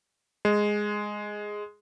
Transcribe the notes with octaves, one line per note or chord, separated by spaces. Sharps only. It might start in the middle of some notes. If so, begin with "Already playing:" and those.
G#3